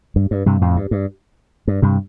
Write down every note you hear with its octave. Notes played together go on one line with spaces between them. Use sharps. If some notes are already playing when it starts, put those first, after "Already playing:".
G2
G2
G2 C3
F2 A2
G2
G2
G2
G2 C3